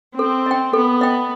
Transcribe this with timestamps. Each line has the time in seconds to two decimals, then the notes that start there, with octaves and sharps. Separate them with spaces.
0.19 C4 A4
0.46 D#5 G5
0.73 B3 A4
1.01 D#5 G5